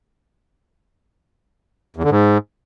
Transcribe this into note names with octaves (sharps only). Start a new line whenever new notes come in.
E2
D3
G#2